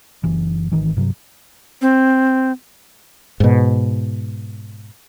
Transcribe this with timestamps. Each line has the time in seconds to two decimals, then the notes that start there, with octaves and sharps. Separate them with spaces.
0.24 F#1 E3
0.72 G#1 D#3 E3
0.97 G2 C3 F#3
1.82 C4
3.40 G#2 B2